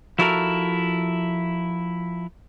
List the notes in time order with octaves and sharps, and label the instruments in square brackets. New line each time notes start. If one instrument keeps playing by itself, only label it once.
[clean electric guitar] F3 E4 F#4 A4 A#4